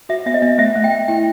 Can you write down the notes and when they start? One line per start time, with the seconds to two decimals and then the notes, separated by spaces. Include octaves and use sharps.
0.09 F#4 E5
0.26 B3 E5
0.34 D#5
0.42 B3
0.58 A3 E5
0.76 A3
0.84 G5
0.92 A3
1.08 E4 G5